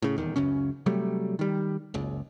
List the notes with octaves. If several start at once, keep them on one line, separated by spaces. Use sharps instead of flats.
A2 C#3
D#1 E2 D#3
C#2 F#2 C#3 C#4
C3 F#3 G3 A3
D#3 G3
F#1 C#2